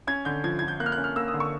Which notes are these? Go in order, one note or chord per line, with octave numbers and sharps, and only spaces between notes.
C#4 G#6
D3 G6
F3 G#6
F3 G#6
G6
A#3 F#6
F6
F#6
C#4
F6
A#3 E6
D#6
D3
C#6